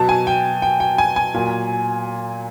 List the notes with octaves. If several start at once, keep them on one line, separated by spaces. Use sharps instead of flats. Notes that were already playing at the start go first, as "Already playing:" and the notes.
Already playing: B2 F#3 A5
G#5
G5
G5
G5
G#5
G#5
A#2 F#3